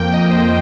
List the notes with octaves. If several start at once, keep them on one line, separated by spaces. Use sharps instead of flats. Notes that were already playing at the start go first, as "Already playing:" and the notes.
Already playing: F2 F3 A#3 G5
D#5
C5